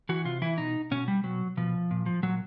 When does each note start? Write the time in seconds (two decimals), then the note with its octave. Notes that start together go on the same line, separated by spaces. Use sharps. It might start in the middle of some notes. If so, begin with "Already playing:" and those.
0.09 E3 F#4
0.25 C3 F4
0.42 E3 E4
0.58 B2 D#4
0.91 B2 C#4
1.08 G3
1.24 B2 F#3
1.57 B2 F3
1.91 A#2
2.06 F3
2.23 A#2 F#3